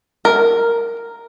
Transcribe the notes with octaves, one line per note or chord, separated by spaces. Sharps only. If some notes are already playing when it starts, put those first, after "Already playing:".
A#4